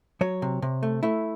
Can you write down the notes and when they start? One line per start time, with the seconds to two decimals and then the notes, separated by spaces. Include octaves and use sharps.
0.21 F#3 C#5
0.42 C3
0.62 C3
0.83 A3
1.03 A3 E4